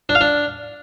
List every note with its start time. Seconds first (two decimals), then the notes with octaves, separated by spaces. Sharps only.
0.09 D4
0.15 F5
0.21 D4